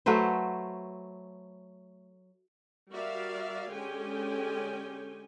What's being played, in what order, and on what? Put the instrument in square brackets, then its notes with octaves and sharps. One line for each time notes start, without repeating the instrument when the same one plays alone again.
[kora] F#3 A3 B4 C5
[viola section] G3 F#4 A#4 D5 E5 F5
D3 G#3 C#4 G4 G5 G#5